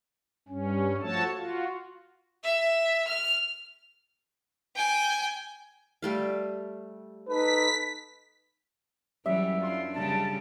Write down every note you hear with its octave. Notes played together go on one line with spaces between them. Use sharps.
G2 C#4
F3 A3 F#4 A4 C#5 A5
F4 F#4
E5
F6
G5 G#5
G3 A3 F5
D#4 A4 B4 B6
F#2 E3 F#3 G3 E5
D4 E4 F4 C6
C#3 G3 A5